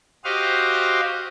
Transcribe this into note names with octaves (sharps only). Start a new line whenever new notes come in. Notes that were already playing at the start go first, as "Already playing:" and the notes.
F#4 G4 C5 D#5 F5